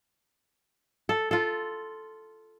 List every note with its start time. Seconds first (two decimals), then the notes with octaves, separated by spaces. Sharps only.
1.09 A4
1.31 F4 A4